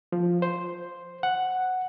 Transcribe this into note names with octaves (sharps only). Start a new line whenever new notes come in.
F3
C5
F#5